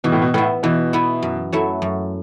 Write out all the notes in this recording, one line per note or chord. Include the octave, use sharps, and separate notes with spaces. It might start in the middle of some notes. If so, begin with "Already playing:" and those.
B2 E3
A2
B2
A2 B3 E4
B2 E3
B3 E4
F#2
F#3 A3 E4
F#2